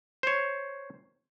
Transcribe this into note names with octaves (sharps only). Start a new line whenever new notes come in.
C5 C#5